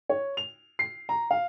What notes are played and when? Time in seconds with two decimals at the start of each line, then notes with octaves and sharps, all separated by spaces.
0.09 C#5
0.37 F7
0.79 C7
1.09 A#5
1.31 F5